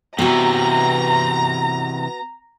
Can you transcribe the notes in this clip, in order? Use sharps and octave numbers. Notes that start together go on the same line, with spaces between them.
C3 E3 B3 F#4 A#5